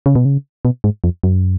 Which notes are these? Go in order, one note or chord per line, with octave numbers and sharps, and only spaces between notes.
C#3
B2
C#3
B2
G#2
F2
F#2